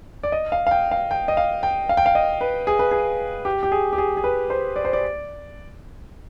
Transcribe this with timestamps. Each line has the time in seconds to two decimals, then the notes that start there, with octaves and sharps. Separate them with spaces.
0.23 D5
0.32 D#5
0.52 F5
0.67 F5
0.71 G5
0.91 F5
1.11 G5
1.28 D#5
1.37 F5
1.63 G5
1.89 F5
1.97 G5
2.06 F5
2.15 D#5
2.41 B4
2.67 G#4
2.79 B4
2.91 G#4
3.45 G4
3.63 G4
3.72 G#4
3.93 G4
3.98 G#4
4.17 G#4
4.24 B4
4.50 C5
4.76 D5
4.85 C5
4.93 D5